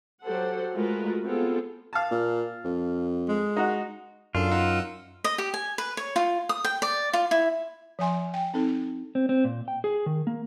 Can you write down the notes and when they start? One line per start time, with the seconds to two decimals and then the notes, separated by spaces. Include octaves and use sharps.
0.23 F#3 G4 A4 C5 F#5
0.73 G#3 A3 F4 F#4 A#4 B4
1.24 B3 C4 F4 G#4 A4
1.93 F5 A5
2.11 A#2
2.64 F2
3.29 G#3
3.56 D#4 F#4
4.35 F#2 D4 F4 A4
4.51 D#4 F#5 E6
5.24 D#5
5.38 G4
5.54 G#5
5.78 B4
5.97 C#5
6.16 F4
6.49 D#6
6.65 G5
6.82 D5
7.13 F4
7.31 E4
7.99 F3 E5 G#5 C6
8.34 G5
8.54 C4 D#4 A4
9.15 C4
9.29 C4
9.44 A#2
9.68 G5
9.84 G#4
10.06 D#3
10.27 A#3